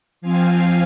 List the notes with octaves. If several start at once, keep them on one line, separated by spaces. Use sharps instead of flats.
F3 C4 F5 G#5